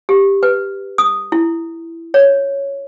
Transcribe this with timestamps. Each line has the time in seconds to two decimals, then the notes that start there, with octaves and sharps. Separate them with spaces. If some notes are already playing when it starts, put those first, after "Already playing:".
0.09 G4
0.43 B4
0.98 D#6
1.32 E4
2.14 C#5